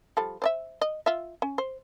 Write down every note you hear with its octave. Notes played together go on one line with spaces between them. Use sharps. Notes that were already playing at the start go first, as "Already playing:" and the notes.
F3 G3 A4
C5 D5 E5
D#5
F4 E5
C#4
C5